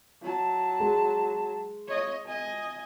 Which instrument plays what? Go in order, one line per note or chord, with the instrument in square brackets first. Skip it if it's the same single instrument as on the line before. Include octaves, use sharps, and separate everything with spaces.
[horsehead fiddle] F#3 A5
[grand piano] G#3
[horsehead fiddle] C#5 D#5
D#5 G#5